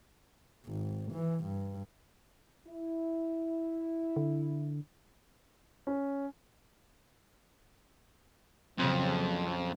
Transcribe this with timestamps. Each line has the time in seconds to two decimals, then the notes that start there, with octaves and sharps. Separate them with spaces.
0.67 G#1
1.12 E3
1.44 G2
2.67 E4
4.16 D3
5.87 C#4
8.78 A#1 F2 C#3 F#3